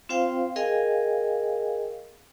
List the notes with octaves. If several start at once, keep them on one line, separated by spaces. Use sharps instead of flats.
C4 F4 C5 F5 G5
G#4 A#4 D#5 F5 G5 G#5